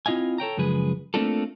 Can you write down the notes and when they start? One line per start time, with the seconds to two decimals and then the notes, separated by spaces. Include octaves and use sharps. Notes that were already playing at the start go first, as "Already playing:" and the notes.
0.06 C4 E4 F4 D#5 F5 G#5
0.38 A4 C#5 G5 A#5
0.57 F#2 C#3 F3 G#3 G#4 B4
1.14 A3 A#3 C4 D4 F4 A4